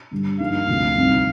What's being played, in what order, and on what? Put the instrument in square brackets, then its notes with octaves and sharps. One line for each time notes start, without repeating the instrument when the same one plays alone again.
[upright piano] G2 D3 G3
[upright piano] G2 D3 F3 A#3 D#4 [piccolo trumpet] F5
[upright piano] D2 C3 F3 A3
C2 C3 G3 C4 D#4